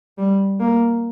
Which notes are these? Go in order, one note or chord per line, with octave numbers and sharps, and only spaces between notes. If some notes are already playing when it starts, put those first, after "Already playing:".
G3
A#3